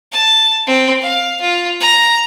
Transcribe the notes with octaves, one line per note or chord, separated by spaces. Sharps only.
A5
C4
F5
F4
A#5